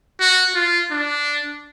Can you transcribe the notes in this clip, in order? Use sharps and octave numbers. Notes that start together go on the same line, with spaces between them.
F#4
F4
D4